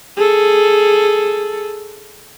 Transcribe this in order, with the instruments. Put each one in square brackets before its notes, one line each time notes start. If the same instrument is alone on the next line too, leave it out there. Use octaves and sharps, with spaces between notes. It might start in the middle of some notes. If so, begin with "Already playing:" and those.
[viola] G#4 A4